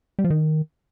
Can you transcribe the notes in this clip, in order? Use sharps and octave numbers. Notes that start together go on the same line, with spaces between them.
G3
F3
D#3